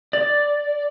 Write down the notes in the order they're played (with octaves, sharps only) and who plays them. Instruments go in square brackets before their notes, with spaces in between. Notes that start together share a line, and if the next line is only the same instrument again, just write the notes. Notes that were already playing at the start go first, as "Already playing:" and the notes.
[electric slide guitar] D5